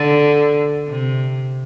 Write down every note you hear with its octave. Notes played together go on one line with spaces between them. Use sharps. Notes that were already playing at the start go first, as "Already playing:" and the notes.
Already playing: D3
C3